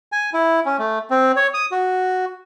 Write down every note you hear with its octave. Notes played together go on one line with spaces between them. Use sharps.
G#5
E4
C#4
A3
C4
C#5
D#6
F#4